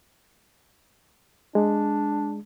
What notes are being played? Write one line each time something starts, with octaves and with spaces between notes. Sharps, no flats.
G#3 D4